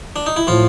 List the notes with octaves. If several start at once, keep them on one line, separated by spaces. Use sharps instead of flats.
D4
D#4
E4
A2 F3 F4